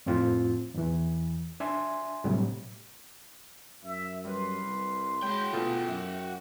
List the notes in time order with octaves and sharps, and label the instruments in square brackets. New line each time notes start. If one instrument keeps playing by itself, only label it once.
[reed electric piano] F2 A2 C4 F4
E2 E3
D4 E5 G#5 C6
A2 C3 F#3 G3
[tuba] F#2 [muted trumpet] E5
[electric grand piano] G3 B4 [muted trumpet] C6
[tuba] C2
[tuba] G#3 [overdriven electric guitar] F#4 G5 [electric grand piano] C#5 B5 G6
[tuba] D2 [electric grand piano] B2 F4 A4
[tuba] F#2 [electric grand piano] E5